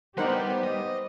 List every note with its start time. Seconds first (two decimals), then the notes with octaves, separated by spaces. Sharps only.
0.18 G3 B3 D#4 G4 A#4 C5 F#5
0.63 D#5